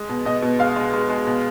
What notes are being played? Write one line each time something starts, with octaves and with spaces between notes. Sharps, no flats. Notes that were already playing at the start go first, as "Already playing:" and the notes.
Already playing: G#3
B2
B2 D#5
B2
G#3 F5
G#3
G#3
G#3
B2